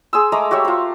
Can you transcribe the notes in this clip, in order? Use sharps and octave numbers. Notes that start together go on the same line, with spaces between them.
G#4 C6 E6
G#3 A3 A#5 D6
F#4 G4 C#5 E5
F4 C5